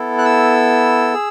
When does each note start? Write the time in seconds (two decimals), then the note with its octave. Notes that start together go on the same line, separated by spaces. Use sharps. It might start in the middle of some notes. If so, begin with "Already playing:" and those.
Already playing: B3 E4 A4
0.18 F#6
0.25 E6
1.13 G#4